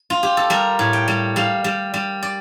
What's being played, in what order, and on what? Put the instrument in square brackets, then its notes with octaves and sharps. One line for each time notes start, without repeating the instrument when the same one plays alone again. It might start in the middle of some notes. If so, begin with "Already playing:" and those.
Already playing: [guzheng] D#4
F4
G4
A4
G3 A#4
A2
G5
G3
G3 F5
G3
G3
D5